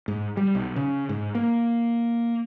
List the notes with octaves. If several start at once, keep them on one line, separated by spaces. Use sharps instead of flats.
G#2
G3
B1
C#3
G#2
A#3